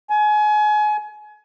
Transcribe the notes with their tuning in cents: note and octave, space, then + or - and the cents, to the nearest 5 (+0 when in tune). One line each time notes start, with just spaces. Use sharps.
G#5 +30